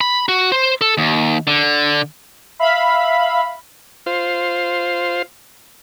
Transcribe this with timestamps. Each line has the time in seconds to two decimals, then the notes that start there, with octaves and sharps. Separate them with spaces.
0.01 B5
0.29 F#4
0.52 C5
0.81 A4
0.98 D#2
1.47 D3
2.59 E5 F5 B5
4.06 F4 C5